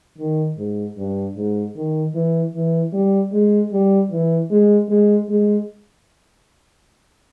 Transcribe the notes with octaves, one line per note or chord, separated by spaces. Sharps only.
D#3
G#2
G2
G#2
D#3
E3
E3
G3
G#3
G3
E3
G#3
G#3
G#3